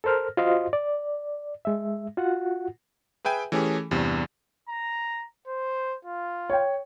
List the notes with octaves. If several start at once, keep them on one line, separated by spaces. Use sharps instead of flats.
A4 A#4 C5 F6
F4 F#4 C5 D#5 F5 C6
D5
G#3 E5
F4 F#4 F#5
G#4 B4 E5 G5 G#5
E3 A3 C#4 G4 G#4
E2 G2 C3
A#5
C5
F4
C#5 G5